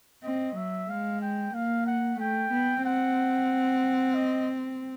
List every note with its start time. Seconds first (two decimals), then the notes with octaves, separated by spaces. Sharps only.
0.24 C4 D#5
0.57 F#3 E5
0.89 G#3 F5
1.21 G5
1.54 A#3 F5
1.87 F#5
2.20 A3 G5
2.52 B3
2.84 C4 F#5
4.15 D#5